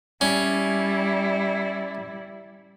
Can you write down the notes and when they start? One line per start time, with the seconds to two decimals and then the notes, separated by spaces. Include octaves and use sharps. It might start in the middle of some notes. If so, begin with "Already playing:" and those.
0.21 G3 C#4 E4